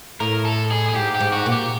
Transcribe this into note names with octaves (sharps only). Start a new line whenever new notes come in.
A2 A#4
A4
G#4
G#4
G#2 G4
G4
G#2
F#4
A#2
G4